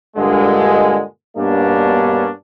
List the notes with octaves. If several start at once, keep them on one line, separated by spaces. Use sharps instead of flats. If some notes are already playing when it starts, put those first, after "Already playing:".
G2 A#2 D3 G#3
G2 B2 A#3 B3 C#4 D4